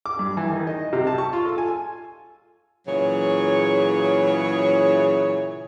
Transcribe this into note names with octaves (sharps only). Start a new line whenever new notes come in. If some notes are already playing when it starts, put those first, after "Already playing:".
D6
G2
E3
D#3
D#5
C3
A5
C#6
F4
A4
G#5
A#2 C#3 E3 F#3 G#4 C#5